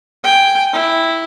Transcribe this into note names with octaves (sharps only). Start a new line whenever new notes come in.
G5 G#5
E4